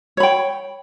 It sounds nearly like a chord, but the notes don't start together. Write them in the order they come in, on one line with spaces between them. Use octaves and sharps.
C#5 B5 G5